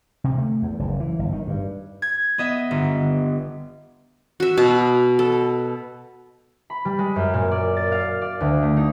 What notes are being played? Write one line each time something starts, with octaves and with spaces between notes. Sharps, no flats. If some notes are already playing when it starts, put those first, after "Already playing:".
C3
A3
E2
F#1
E3
G1
D#3
G2
G#6
B3 D#5 E5
G1
F#4 E5
B2 A5
A4
B5
G3
G#3
F#2
A#2
D5
A6
F5
D5
D2
A3
D#4